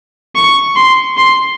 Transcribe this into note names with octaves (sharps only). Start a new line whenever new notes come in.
C#6
C6
C6